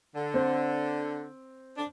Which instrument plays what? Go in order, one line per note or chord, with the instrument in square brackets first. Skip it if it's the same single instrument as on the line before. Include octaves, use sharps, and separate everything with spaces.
[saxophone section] D3
[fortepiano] C4
[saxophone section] D4